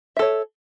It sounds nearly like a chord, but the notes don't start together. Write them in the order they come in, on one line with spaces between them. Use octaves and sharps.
E5 A4 C#5